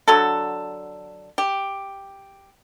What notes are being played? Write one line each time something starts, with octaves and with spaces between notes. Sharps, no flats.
D3 F#3 F#4 A4
G4